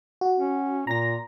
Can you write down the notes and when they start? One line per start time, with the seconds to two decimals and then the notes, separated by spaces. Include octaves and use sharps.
0.21 F#4
0.38 C#4
0.87 A#2 A#5 A#6